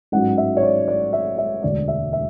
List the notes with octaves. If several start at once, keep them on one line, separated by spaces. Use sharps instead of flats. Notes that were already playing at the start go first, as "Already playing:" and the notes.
A1 G#2 F#3 F#5
E5
C#5
D5
D5
E5
E5
E1 D2 D3 D5
E5
E5